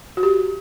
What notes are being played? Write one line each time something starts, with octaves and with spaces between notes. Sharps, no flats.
F#4
G4